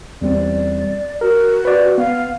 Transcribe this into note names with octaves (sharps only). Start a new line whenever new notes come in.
E2 G3 C4 D5
F#4 A#4
B4 D5
B3 F5